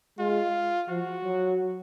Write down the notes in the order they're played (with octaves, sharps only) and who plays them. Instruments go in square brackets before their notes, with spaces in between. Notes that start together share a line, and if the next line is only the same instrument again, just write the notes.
[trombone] G#3 [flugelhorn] F4
[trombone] F3 [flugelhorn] F#4
[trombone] F#3